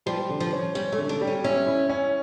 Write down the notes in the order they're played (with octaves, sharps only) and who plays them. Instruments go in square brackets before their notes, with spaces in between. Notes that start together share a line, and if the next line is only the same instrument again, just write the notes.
[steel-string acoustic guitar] F3 [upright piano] G3
[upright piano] D3
[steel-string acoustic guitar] F3
[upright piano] C#4
[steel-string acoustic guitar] G3 [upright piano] C#4
[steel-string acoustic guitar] A3
[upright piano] D3
[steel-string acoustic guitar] D4
[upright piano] G3
[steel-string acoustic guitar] C#4
[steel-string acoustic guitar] C#4 [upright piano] E4
[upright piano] E4
C#4